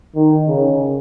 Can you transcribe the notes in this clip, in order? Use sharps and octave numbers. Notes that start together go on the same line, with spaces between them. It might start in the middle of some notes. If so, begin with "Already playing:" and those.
D#3
C#3